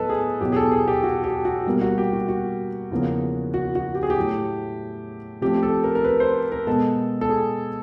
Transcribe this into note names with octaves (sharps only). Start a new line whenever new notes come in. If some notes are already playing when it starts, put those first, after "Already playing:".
Already playing: A2 F#3 B3 A4 B4 D#5
G#4
E2 B2 F#3 G4
G#4
A4
G#4
G4
F#4
G4
F#4
B2 G3 A#3
F#4
G4
F#4
F#4
E2 C#3 F3 A#3
F#4
F#4
G4
G#4
G4
A2 F#3 A3
C3 F3 A3 C4 G4
A4
A#4
A#4
B4
C5
A#4
B2 G#3 B3 A4
A4
G#4